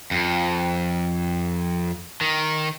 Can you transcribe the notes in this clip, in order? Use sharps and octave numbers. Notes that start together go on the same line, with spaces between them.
F2
D#3